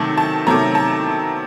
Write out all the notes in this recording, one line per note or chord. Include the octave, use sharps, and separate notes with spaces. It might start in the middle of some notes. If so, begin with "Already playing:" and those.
Already playing: C3 D#3 F#3 A3 A5
A5
C3 D#3 F#3 A3 A#5
A5